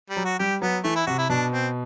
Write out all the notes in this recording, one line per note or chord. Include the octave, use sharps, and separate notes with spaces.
G3
F#3
F#4
G3 G4
F#3 B3
E3 A3
E4
C3 F#4
E4
B2 D4
C4